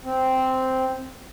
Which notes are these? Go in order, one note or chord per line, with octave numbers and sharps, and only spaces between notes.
C4